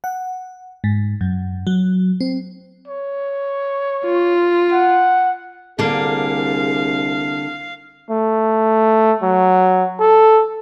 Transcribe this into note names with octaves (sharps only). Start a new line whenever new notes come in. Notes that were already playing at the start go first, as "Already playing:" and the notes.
F#5
G#2
F#2
F#3
C4
C#5
F4
F#5
C2 D3 A#3 G#4 F5
A3
F#3
A4